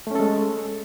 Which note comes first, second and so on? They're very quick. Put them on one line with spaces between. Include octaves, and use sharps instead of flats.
A3 C#4 A4 G#3